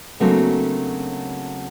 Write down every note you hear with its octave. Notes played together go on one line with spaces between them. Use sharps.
C#3 F#3 A3 A#3 C4 D4